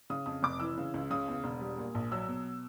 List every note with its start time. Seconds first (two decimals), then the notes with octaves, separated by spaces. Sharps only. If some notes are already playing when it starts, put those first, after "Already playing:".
0.10 C#3 D#6
0.26 F2 D#6
0.43 F1 D6
0.60 E3 E6
0.78 C#3
0.94 C#2
1.10 C#3 D#6
1.28 E2
1.44 E1
1.61 G3
1.78 A#2
1.95 A#1
2.12 F#3 E6
2.28 B2